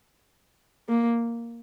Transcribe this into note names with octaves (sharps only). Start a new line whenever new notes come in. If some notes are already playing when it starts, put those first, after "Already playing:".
A#3